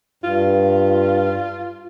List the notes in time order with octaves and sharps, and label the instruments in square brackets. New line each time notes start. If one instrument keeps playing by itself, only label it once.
[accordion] G2 [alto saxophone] F4